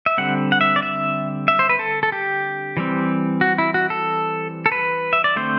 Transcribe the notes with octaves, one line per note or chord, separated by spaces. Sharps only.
E5
D3 G3 C4 F#5
F#5
E5
D5
E5
E5
C5
B4
A4
A4
G4
E3 G3 C4
F#4
E4
F#4
A4
A4
B4
E5
D5
D3 A3 C4 C5